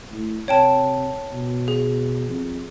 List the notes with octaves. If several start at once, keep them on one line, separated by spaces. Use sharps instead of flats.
A2
C3 C#5 G5 A5
B2
G#4
F2